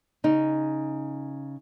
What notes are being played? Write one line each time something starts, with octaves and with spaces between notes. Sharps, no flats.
C#3 D#4